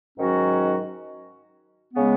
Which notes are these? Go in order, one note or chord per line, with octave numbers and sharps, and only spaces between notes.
G#2 D#3 F#3 C#4 F#4
C#3 G#3 B3